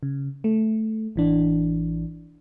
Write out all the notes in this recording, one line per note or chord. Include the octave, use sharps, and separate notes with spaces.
C#3
A3
A1 E3 D4